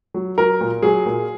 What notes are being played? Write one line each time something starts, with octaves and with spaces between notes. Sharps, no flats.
F#3
F#3 A#4
A#2
F#3 G#4
A#2